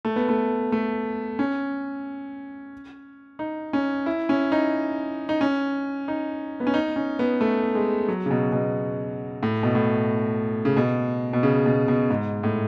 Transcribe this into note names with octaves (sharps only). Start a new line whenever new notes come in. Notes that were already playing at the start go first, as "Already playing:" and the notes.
A3
B3
A3
A3
C#4
D#4
C#4
E4
C#4
D#4
D#4
C#4
D#4
B3
C#4
D#4
C#4
B3
A3
G#3
F#3
C#3
B2
B2
A2
B2
A2
C#3
B2
B2
C#3
B2
B2
G#2
A2